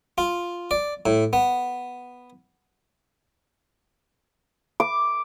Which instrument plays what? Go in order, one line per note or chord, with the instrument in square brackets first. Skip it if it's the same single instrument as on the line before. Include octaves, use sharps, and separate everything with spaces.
[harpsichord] F4
D5
A2
B3
[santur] D6